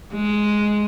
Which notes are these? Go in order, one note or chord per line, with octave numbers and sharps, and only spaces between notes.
G#3